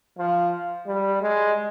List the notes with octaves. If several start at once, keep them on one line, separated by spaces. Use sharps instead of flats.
F3
G3
G#3